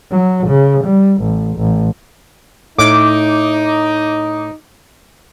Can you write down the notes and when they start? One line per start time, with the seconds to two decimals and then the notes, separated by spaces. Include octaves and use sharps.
0.11 F#3
0.47 C#3
0.84 G3
1.22 A1
1.57 A1
2.78 A2 D#4 D6